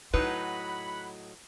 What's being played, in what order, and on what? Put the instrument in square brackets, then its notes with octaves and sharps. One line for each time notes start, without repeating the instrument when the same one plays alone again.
[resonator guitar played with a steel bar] A2 F#3 D#4 [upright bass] E4 [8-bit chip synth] B4 [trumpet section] F#5 B5